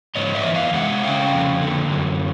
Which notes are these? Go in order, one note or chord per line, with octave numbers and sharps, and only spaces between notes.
G#2 C#5 D#5
D5 E5
E3
D#5 F5
G#3 E5 F#5
C#3 F5 G5
F2
D3
F#2